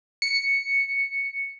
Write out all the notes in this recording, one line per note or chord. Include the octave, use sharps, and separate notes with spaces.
C#7